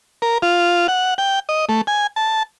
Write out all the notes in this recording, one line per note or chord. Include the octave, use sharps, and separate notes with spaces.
A#4
F4
F#5
G5
D#5
A3
G#5
A5